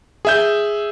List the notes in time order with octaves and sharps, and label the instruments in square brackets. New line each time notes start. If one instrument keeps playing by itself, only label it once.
[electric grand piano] G#4 E5 G6